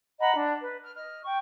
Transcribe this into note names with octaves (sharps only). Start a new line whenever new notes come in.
D#5 F#5 A#5 B5
D4
B4
F6
D#5 F6
G5 C#6